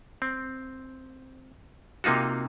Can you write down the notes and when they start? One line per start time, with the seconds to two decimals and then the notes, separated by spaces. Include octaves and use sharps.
0.22 C4
2.04 C3 A#3 D#4 F4 F#4